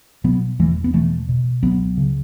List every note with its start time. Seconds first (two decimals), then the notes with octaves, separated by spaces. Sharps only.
0.24 B2 F#3 B3
0.59 E2 E3 A3
0.84 B3
0.93 B2 E3 A3
1.29 B2
1.62 C#2 F#3 B3
1.97 C#3